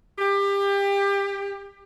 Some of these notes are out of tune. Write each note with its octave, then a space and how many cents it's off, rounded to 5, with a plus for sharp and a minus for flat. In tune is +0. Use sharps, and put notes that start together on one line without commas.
G4 +25